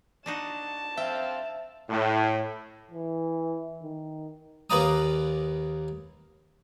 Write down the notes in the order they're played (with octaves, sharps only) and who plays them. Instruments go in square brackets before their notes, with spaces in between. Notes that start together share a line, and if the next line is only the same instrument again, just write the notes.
[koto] D4 D#4 F#4 [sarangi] A5
[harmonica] C4 F5 [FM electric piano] E5 [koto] G5
[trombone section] A2
[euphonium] E3
D#3
[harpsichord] D#2 A#3 B4 D5 A#5 D#6